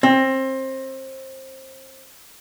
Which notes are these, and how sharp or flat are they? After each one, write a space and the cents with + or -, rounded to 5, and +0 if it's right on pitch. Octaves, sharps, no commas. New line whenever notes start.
C4 +25